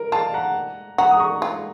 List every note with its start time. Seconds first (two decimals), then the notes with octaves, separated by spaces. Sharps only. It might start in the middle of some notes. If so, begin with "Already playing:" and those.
Already playing: A#4
0.12 F4 F5 A5
0.34 F#5 A#5
0.98 F#4 F#5 A#5
1.11 D#6
1.20 A#5 C#6
1.42 F4